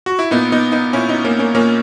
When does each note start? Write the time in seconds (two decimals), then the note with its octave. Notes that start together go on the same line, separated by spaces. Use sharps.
0.06 F#4
0.19 E4
0.31 A#2 B3 D#4
0.52 B3 D#4
0.72 B3 D#4
0.93 A#2 C#4 E4
1.09 B3 D#4
1.25 A#3 C#4
1.39 A#3 C#4
1.54 A#2 A#3 C#4